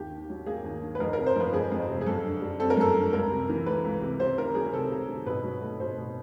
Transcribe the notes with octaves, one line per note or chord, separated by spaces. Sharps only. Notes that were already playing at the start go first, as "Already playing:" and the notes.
Already playing: D#2 G4
D#3
F#3
A#3 G#4
D#2
D#3
B4
F2 A#4
C3 A#4
C5
F3 B4
F2 G#4
F2
C3
G#4
F#2 A4
D3
G3
C4 A4
A#4
F#2 A4
D3
C#2 A#4
C3
E3
A3 B4
C#2
C3
C3 C5
D#3 A#4
F#3 G#4
C3 A4
C3
D#3
B2 B4
F#3
A3
B2 C5
B2